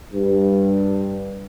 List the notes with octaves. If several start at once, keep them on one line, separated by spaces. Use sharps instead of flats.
G2